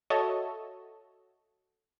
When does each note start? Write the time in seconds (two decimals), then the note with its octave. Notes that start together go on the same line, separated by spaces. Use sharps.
0.10 F#4 A4 C#5 D#5 E5 A5